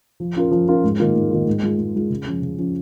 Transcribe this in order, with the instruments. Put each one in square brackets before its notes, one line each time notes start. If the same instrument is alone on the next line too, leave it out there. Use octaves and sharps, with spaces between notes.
[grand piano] F3
C#4 F4 A#4
F3
C#4 F4 A#4
G#2
D#3 A#3 F4
G#2
D#3 A#3 F4
G#2
G#3 F4
G#2
G#3 F4
C#3
F3 C#4
C#3
F3 C#4